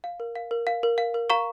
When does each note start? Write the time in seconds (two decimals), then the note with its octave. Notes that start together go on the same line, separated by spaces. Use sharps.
0.04 F5
0.20 A#4
0.35 F5
0.51 A#4
0.67 F5
0.83 A#4
0.98 F5
1.14 A#4
1.30 F5 A#5 C#6